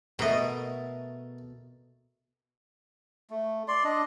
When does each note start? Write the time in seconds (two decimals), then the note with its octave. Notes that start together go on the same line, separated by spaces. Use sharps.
0.19 B2 A3 A#4 D#5
3.30 A3
3.68 D5 C6
3.84 D4 D#5